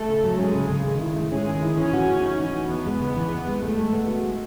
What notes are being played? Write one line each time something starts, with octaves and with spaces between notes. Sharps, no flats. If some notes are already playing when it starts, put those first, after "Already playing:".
Already playing: A3 A4
C#3
F#3
G#3 C#4 G#4
C#3
C#3
D#3
E4
A3
G#3 C#4 G#4
D#3
E4
E3 C#4
F#4
A3
C#4 D#4
E3
F#4
E2 B3
G#3
C#3
E3
E2
G#3
G#3 A3
G#3
B3
F#4
G#3